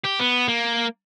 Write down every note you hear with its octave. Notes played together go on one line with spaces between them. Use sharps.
G4
B3
A#3